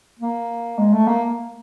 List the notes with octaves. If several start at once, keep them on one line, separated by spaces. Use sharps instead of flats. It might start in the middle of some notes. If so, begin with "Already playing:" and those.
A#3
G#3
A3
A#3